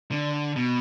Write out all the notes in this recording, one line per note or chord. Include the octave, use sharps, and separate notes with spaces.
D3
B2